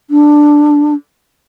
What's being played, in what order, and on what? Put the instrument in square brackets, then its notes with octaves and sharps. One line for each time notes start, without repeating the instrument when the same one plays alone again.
[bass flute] D4